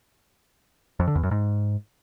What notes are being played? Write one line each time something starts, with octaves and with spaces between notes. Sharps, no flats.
F2
D3
E2
F#2
G#2